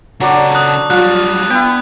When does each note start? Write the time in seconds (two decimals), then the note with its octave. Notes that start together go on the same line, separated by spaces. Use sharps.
0.21 C#3 F#3 D4 A4
0.55 D#6 F#6
0.90 F#3 G3 F4 F#6
1.50 B3 E4 G5